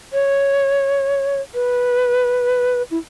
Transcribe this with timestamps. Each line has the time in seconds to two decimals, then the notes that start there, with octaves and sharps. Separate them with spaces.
0.13 C#5
1.54 B4
2.91 E4